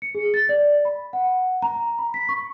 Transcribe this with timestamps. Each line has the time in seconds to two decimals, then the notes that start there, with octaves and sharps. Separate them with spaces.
0.02 C#7
0.15 G#4
0.34 A6
0.49 D5
0.85 B5
1.13 F#5
1.62 A#5
1.99 B5
2.14 B6
2.29 C#6